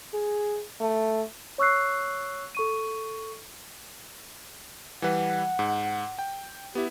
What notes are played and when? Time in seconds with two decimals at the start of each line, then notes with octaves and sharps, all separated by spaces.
0.14 G#4
0.81 A3
1.58 C#5 C#6 E6 F#6 C7
2.55 A4 C#6 D#7
5.02 E3 G3 B4 F#5
5.59 G#2
6.19 G5
6.75 B3 E4 G4